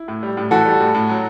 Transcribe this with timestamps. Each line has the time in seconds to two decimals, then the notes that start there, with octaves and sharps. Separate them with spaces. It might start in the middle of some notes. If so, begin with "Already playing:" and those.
Already playing: E4
0.08 A2
0.23 G3
0.37 A2
0.51 E3 F#4 A4
0.65 G3
0.80 A2
0.95 A2
1.09 F#3